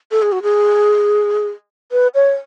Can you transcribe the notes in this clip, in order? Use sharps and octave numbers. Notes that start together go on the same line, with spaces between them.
A4
G#4
F#4
G#4
B4
C#5